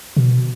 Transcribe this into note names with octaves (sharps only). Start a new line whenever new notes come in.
B2